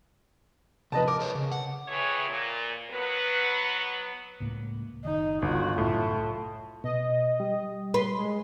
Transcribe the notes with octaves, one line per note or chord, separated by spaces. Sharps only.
C3 F3 B4 D#5 A5
A#4 D6
A#4 B4 C#5
C#3
F#5
F2 E3 A3 G#4 B4 C#5
A#2
F#3 B3 B4
C#2 A2 A#3
F#1 D#3 D#4
G1 C#2 D3 B3 F4 F#4
C2 F#2 A2 A3
B2 D#5
G3
B4 C6
G#3